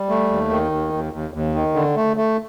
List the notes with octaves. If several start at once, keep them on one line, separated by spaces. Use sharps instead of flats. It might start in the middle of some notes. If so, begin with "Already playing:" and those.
Already playing: G3
A3
D#2
D#3
D#2
D#2
D#2
D#2
D#3
D3
A3
A3